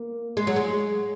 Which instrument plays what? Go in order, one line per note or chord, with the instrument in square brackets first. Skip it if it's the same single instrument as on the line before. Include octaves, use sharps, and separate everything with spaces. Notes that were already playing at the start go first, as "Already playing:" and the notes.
Already playing: [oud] A#3
G#3
F#3
G#3